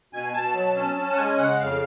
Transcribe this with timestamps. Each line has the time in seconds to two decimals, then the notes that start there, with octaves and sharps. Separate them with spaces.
0.13 B2 G#5
0.34 B2 A5
0.54 F#3
0.76 C#4
0.97 C#4
1.12 F#5
1.17 G#3 G#5
1.38 C#3 F#5
1.59 F2 F5